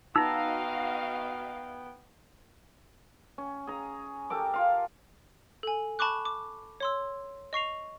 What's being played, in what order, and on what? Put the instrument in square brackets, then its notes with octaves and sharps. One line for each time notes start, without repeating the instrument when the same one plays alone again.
[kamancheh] B3 G5 [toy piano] D#4 [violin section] F#4 D#5 F5 [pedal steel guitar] A#5 E6
[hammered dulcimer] C#4
G#4 A#5
G4 A4 A#4 D6
F4 F5
[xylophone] A4 G#5
A5 B5 C#6 D6 F#6
D6
C#5 C6 E6
D#5 C#6 C7 F7